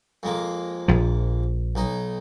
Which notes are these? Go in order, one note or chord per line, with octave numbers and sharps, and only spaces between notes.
F2 G#3 A#3
A#1 F3
B1 D#4